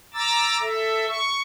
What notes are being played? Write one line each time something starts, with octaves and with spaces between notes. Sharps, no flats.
A#5 D6 E6 A6
A4 E5
C#6